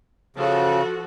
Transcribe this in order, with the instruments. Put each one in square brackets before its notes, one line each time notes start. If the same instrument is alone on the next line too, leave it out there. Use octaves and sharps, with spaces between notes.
[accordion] C#3 [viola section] F3 F#4 A4